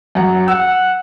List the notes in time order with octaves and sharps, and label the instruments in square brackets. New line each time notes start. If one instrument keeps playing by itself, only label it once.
[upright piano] F#2 F#5
[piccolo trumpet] F#5 [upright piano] E6